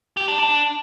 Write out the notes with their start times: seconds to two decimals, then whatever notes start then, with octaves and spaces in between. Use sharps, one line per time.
0.17 G4
0.28 D4
0.39 D4